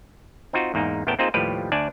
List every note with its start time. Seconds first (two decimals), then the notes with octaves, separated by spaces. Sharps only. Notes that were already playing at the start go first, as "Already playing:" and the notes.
0.53 C4 D#4 F4 F#4
0.74 E2 G#2 A#3 D#4
1.07 A1 E2 B3 A#4 G5 A5
1.19 A#3 C4 D#4 F4 G#4 C5
1.34 D#2 A2 F3 G3 G4 B4
1.72 D2 D4 D5 G#5 A5